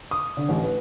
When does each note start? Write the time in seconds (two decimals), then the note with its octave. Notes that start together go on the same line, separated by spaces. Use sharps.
0.11 D#6
0.37 D3
0.49 A1
0.64 B4